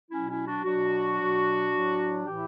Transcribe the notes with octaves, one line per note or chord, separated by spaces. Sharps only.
B2 F#3 C#4 E4
C#4 E4
D4 F#4
B2 F#3 D4 F#4
B2 F#3
A2 F#3
A2 E3 E4 G4